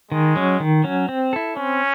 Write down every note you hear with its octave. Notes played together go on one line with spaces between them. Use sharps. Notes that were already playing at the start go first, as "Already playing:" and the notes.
D#3 G#3
F#3 C#4
D#3
F#3 C#4
C4
E4 A4
C4 C#4